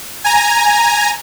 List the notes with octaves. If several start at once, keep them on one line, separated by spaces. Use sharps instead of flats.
G#5 A#5